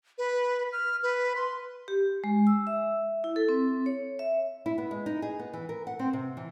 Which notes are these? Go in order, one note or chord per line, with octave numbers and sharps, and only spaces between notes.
B4
F6
B4
C6
G4
G#3
E6
E5
E4
A4
C4
C#5
E5
E4
B3
G#3
D#4
G#4
B3
E3
A#4
F#5
C4
C3
E3